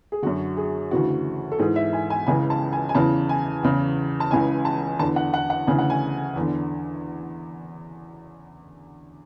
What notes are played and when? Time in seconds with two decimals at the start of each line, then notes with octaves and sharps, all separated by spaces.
0.12 G#4
0.22 F#2 D3 F#4
0.57 G#4
0.91 D2 C#3 E3 F#4
1.52 A4
1.59 G#2 E3 G#4
1.76 E5
1.93 G#5
2.10 G#5
2.27 C#2 C#3 E3 G#5
2.50 A5
2.73 G#5
2.89 G#5
2.95 E2 C#3 E3 A5
3.29 G#5
3.63 E2 C#3 E3
4.20 A5
4.31 C#2 C#3 E3 G#5
4.65 A5
4.99 E2 D3 A5
5.16 F#5
5.34 F#5
5.50 F#5
5.67 D2 C#3 E3 G#5
5.78 F#5
5.90 G#5
6.36 E2 D3